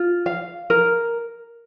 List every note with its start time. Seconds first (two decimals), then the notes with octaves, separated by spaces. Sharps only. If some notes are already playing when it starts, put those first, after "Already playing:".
Already playing: F4
0.26 F5
0.70 A#4